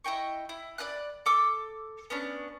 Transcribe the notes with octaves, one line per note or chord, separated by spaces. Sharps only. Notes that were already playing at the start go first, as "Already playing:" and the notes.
E4 D#5 G5 C#6
E4
D5 D#5 B5 F#6
A4 D6 E6
B3 C#4 D4